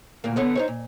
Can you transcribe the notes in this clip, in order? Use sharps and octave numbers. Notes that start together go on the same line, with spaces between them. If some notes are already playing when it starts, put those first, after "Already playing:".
D2 A#2 A#3
D3 B3 C#5
D#4 C5 C#5
A#2